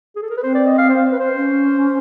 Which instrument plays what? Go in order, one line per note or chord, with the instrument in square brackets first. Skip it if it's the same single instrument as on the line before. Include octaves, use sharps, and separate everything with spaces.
[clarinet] G#4
A4
A#4
B4
[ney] C4 [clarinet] C5
[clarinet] D5
D#5
F5
C5
B4
C5
[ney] C#4